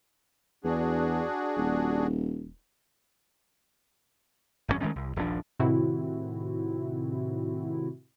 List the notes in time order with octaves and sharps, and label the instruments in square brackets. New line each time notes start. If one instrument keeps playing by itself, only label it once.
[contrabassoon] E2 [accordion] D4 F#4 G#4
[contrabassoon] D#1
[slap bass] G#1 F#2 C3 C#4
D#3 G#3 A3 C#4
C2
D#1 A#1 F3 D4
[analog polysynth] A2 C3 D#3 C4 E4 F#4